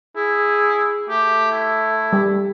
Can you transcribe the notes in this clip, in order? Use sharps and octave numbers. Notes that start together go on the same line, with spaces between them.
E4 G#4
A3 G4
E4
G3